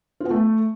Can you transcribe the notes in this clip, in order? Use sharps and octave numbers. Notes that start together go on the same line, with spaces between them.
F4
B3
A3